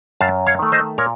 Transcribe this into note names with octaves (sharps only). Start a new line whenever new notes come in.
F#2 F5 A5
C#5 F5
D#3 A3
C5 D#5
A#2 A#4 C#5